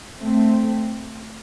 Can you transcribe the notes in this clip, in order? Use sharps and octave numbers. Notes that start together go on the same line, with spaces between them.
A3 C4